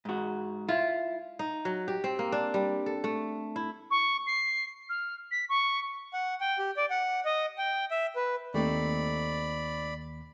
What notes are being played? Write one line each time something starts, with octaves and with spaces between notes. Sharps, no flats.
G#2 F#4
E4 F4
D#4
F#3
G4
C4
A#3
D4
G3
A4
A3
E4
C#6
C7
F6
B6
C#6
F#5
G5
G4
D5
F#5
D#5
G5
E5
B4
D#2 A3 C4 D#4 D5 B5